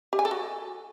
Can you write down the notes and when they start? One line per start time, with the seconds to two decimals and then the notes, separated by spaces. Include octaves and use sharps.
0.13 G4
0.19 G#5
0.25 A4
0.31 F#4